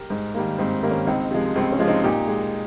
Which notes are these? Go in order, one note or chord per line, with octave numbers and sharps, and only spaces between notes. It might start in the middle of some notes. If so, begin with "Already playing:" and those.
Already playing: G4 A#4
G#2
D#3 G3 A#3
G#2 C4
D#3 G3 A#3
C#4
C#2 C4 D#4
C3 F3 G#3
C#2 C4
C#4
C3 F3 G#3
C4 D#4
A#2 D#4 G4
G#3